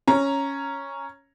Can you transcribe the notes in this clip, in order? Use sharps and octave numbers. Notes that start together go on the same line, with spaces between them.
C#4 A#5